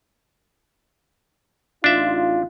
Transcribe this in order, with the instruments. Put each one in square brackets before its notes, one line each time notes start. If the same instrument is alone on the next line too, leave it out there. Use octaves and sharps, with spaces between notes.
[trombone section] A1 D#4 F4 [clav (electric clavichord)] D4 E5